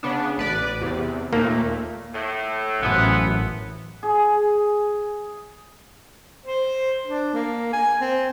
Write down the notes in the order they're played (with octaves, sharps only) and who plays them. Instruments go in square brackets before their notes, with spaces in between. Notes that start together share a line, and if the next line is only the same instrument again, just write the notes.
[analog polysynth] C#3 B3 D4
A1 B4 D5
E2 C3
[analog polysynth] D#2 A#2 A3 [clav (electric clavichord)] A#3
[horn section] A2
[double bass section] A1 F#2 [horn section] E3 F3 B3
[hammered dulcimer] G#4
[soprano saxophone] C5
D4
A#3
G#5
C4